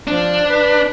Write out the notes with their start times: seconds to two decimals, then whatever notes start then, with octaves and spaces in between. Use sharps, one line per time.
0.07 F3 D4
0.49 B4